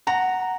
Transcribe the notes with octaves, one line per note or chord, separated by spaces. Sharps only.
F#5 A#5